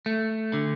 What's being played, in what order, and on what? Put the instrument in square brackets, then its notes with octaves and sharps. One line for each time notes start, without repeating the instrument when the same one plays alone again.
[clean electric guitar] A3
D3